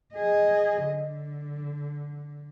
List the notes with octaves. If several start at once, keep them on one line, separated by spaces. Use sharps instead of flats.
G#4 D#5
D3